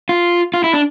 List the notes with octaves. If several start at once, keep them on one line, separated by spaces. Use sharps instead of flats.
F4
F4
E4
D4